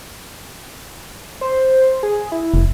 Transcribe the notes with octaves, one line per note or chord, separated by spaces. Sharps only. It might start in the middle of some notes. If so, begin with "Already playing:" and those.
C5
G#4
E4
F1